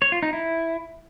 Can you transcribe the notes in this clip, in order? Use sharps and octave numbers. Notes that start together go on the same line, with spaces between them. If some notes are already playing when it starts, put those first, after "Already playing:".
C#5
F4
D#4
E4